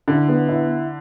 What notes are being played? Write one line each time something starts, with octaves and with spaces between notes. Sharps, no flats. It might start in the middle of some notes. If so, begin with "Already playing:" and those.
D3 E4
B3
E4